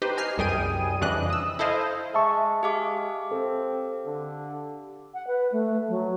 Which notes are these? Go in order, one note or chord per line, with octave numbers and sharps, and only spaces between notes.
D#4 G4 B4 C5
D#5 G#5 F6 C7
C2 F#2 G3 G#4 G5 D#7
F2 C#3 E3 D4 D#5 F#6
D#6 E6
E4 A4 C5 D#5 F5
G#3 E5 A5 C#6
G#3 G4 F5 D6
C4 A4
D3
F#5
B4
A3
F#3